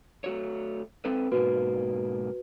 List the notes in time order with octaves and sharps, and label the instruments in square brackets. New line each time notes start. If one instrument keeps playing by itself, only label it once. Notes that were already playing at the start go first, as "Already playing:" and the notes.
[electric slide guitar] A3 F#4 C#5
C4 A4 B4
[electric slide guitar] G#2 B2 A#3 [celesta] F#4 B4